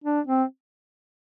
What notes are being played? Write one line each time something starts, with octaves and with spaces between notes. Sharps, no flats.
D4
C4